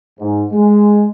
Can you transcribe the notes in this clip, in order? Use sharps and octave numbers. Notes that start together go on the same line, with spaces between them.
G#2
G#3